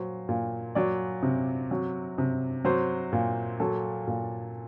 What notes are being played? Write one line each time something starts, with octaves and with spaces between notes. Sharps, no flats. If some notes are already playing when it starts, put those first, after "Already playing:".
Already playing: A#2 F#3 C5
A#2
F#3 D5
C3
F#3
C3
F#3 C5
A#2
F#3 A4
A#2